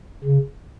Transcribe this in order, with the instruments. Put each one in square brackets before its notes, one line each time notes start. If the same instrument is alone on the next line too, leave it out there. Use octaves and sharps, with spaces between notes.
[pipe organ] C#3